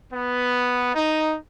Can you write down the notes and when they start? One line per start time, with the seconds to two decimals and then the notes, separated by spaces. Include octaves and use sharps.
0.13 B3
0.95 D#4